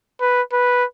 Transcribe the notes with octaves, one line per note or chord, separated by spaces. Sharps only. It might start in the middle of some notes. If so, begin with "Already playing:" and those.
B4
B4